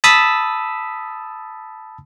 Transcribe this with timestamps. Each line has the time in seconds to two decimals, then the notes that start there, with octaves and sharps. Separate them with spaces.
0.04 A5 B5 D#6 E6 A6 B6